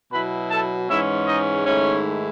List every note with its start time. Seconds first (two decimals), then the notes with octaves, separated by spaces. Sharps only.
0.12 B2 F#3 B3 E4 B4 B5
0.51 A4 A5
0.89 G#2 E3 G#3 C#4 E4 E5
1.28 D#4 D#5
1.66 G#2 D#3 A3 C#4 E4 C#5